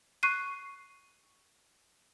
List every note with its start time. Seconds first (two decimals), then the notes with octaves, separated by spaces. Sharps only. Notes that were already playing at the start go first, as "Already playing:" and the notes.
0.23 C#6 F#6 C7 D#7